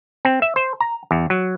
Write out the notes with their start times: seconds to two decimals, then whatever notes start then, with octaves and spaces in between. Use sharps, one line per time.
0.25 C4
0.42 E5
0.56 C5
0.80 A#5
1.11 E2
1.30 F#3